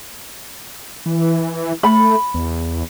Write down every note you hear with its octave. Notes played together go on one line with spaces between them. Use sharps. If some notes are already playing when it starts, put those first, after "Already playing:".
E3
A3 B5
E2